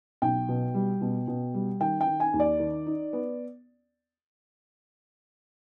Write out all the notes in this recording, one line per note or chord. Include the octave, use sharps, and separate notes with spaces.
B1 G5
B2
G3
B2
B2
G3
D#3 G5
G5
D#3
G#5
D#2
D5
D#3
D#4
B3